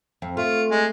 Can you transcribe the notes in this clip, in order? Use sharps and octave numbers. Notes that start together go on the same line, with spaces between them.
F2
A3 F4
G#3